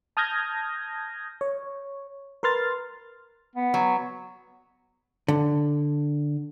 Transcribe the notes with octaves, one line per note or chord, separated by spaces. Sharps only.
A5 D#6 F6 G6 G#6 A#6
C#5
A#4 B4 C6 F6 A6
B3
F#3
D3